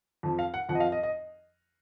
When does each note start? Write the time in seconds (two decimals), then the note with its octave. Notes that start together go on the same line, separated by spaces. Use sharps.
0.23 F2 F3
0.39 F5
0.54 F#5
0.69 F2 F3 F#5
0.75 D#5
0.80 F5
0.92 D#5
1.03 D#5